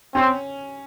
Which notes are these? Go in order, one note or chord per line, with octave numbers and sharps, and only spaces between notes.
C4 C#4